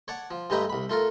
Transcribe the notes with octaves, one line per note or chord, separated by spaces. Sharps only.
C#5 D5 F#5 A5
F3
G2 G#3 A3 G4 B4 A#5
C2 B5
A3 F4 A4 A#4